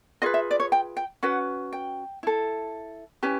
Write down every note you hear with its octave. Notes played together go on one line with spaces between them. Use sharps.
F4 G#4 B4 D#5
E5
D5
C#5
G5
G5
C#4 F#4 B4 F#5
G5
E4 A4
C#4 E4 G4 B4 G#5